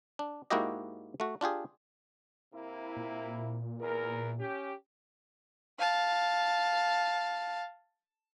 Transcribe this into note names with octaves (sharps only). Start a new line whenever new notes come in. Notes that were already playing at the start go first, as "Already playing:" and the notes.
D4
G#2 A#3 E4 F#4 G4 D#5
A3 F#4
D4 F4 G4 G#4
C3 A#3 E4
A#2
E2 A#4
C#4 G4
F5 A5